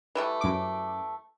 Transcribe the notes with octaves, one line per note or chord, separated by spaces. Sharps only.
E3 G3 A3
F#2 D6